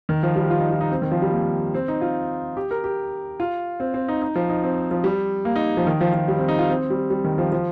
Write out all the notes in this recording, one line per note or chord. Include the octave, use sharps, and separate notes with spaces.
D#3
F3
G3
F4
D#4
F4
D#4
C4
D#3
F3
G3
A#3
C4
D#4
F4
G4
A#4
G4
F4
C4
C4
D#4
D#4
F3
D#4
C4
F3
G3
A#3
D#4
F3
D#3
F3
F3
G3
C4
D#4
F4
C4
G3
G3
D#3
F3
F3